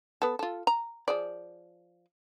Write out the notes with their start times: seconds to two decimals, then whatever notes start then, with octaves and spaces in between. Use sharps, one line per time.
0.22 B3 A4
0.39 F4 A4
0.67 A#5
1.08 F3 G#4 D5